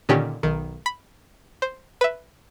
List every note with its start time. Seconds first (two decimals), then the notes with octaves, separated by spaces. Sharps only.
0.09 A#2 D3 D#3 C#4 D4 G4
0.43 B1 D#3
0.86 B5
1.62 C5
2.01 B4 E5